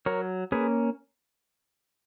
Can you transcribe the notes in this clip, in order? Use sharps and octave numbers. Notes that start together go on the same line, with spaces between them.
F#3 A#4 C#5
A#3 C#4 G#4 B4